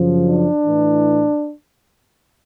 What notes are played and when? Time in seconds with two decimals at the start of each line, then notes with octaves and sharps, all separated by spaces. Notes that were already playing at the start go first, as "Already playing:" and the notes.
Already playing: F#2 C#3 F3
0.24 D4
0.63 A2 E3